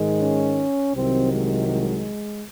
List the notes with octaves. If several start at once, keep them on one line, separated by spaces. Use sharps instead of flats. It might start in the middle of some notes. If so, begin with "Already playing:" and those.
Already playing: G#2 D#3 G#3
C#4
C2 C3 D#3 F#3 C4
G#3
G#3